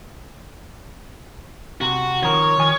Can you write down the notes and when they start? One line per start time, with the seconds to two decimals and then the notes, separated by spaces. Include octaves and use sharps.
1.81 C3 F#4
2.23 D#3 F3 A#4 C#5
2.58 D#3 F3 G#5